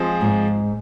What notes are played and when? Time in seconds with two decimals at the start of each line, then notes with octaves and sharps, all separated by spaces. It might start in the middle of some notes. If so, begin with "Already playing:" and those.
Already playing: F3 G#3 C4
0.21 G#2